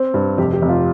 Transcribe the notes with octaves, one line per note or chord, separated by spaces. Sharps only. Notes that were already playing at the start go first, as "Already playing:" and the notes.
Already playing: C4
G2
F1 G4
G4
F1
F4